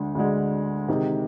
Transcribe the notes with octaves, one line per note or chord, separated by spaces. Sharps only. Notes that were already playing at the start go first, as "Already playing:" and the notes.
Already playing: D2 D3 G#3
D2 D3 G#3
C3 D#3 G#3